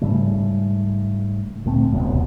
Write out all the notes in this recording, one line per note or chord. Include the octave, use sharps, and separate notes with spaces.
G#2 C#3 G3 A3
D2 A#2 A3 C4
D#1 C2 F#2 B2